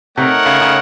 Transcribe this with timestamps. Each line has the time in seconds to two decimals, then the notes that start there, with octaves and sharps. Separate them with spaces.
0.17 C3 A3 D#4 A#4 C#5 F#5
0.46 C#3
0.61 C#3